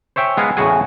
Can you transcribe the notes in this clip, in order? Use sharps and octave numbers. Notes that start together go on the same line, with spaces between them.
C5 C#5 E5 G5 G#5
G#3 B3 F5 G#5 A#5
E2 A2 C#3 F#4 G#4 G#5